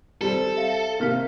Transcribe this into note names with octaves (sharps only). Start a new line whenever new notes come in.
G3 C4 A4
E5 F5
C3 A#3 F5 F6 B6